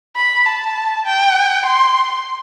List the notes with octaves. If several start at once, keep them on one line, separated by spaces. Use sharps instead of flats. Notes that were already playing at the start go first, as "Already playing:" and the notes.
B5
A5
G5
C6